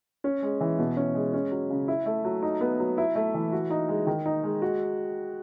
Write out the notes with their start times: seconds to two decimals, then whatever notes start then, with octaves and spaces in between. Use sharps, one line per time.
0.24 C#4
0.42 G#3
0.61 E3
0.78 B2
0.97 C#4
1.15 G#3
1.34 C#4
1.51 F#3
1.70 C#3
1.88 E4
2.06 A3
2.24 F#3
2.42 D#4
2.61 B3
2.80 F#3
2.98 E4
3.15 A3
3.34 E3
3.52 F#4
3.70 D#4
3.88 G#3
4.07 D#3
4.26 D#4
4.44 G#3
4.62 F#4